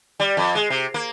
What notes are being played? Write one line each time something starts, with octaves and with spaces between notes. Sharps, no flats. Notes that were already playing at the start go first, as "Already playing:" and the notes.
G3
F2
G#3
C3
A#3